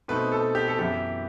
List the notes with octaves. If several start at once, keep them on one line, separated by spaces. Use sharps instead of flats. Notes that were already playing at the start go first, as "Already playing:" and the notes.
B2 A3 C4 D#4 B4
A4
G4
A4
F#2 E3 B3 E4 G4